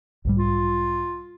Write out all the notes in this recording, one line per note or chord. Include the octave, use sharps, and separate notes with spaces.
B1 G#2 G3
F4